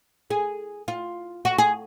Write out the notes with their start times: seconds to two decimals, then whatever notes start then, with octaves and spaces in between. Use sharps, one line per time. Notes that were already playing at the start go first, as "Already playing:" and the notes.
0.30 G#4
0.88 F4
1.45 F#4
1.58 G#4